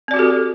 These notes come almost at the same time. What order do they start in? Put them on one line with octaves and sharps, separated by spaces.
C4 D5 F#4 G4 A4